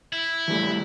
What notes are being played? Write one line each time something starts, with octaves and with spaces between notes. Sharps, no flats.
E4
E3 G3 A3